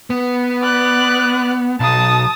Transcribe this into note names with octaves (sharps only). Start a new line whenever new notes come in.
B3
D5 F#6
B1 A5 D#6